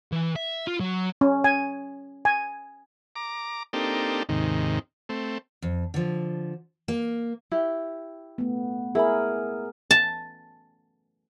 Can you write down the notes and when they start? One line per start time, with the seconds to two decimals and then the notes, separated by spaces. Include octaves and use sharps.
0.12 E3
0.36 E5
0.67 F4
0.80 F#3
1.21 C#4
1.44 G#5
2.25 G#5
3.16 A#5 D6
3.73 A#3 C4 D4 D#4 G4 A4
4.29 D#2 G#2 C3 D#3
5.09 A3 C4
5.62 F2
5.94 D3 F3
6.88 A#3
7.52 E4 G4
8.38 A3 B3
8.95 E4 G#4 A#4 B5
9.91 A5